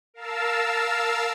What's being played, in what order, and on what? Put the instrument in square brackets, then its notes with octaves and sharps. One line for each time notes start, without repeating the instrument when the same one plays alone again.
[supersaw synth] A#4 F5 A5 E6